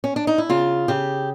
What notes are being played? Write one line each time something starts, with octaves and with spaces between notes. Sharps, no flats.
C#4
D4
D#4
E4
C#3 F4
C#3 G4